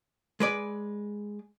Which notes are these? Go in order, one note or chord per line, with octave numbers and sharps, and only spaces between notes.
G#3 B4 D5